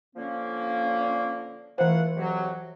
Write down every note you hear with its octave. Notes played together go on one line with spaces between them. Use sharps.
D3 F3 A#3 C#4
E3 A3 E4 F4 C5 F#5
F2 C3 F#3 F#4